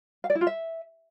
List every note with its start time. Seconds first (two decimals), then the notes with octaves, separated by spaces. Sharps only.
0.24 F5
0.30 D5
0.35 E4
0.41 F4
0.47 E5